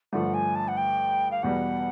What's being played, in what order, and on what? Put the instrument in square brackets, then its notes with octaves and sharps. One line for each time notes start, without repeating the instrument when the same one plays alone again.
[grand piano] G2 D3 F3 A3 [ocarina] F#5
[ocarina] G#5
A5
F#5
G5
F5
[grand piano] E2 B2 G3 [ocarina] F#5